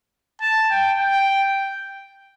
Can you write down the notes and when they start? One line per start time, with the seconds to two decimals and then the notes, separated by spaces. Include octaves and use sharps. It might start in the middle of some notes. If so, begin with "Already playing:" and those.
0.41 A5
0.71 G5
1.00 G5